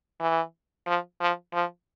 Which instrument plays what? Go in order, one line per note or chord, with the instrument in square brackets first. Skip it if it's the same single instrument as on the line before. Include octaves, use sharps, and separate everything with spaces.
[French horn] E3
F3
F3
F3